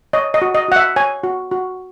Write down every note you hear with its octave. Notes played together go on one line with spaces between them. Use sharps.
C#5 D#5
D#5
F#4
D#5
F#4 F#5
E5
C#5 G#5
F#4
F#4